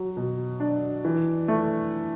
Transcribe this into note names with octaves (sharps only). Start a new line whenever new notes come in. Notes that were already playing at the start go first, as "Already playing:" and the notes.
Already playing: F#3
B2
D4
E3
A3